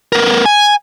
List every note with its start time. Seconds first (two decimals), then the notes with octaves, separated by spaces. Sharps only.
0.12 B3 A#4
0.45 G#5